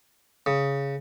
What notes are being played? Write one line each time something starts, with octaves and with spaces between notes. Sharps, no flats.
C#3